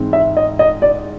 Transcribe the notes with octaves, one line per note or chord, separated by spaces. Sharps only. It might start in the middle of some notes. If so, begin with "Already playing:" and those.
Already playing: G#2 E3 G#3 C4
E5
D#5
D#5
D5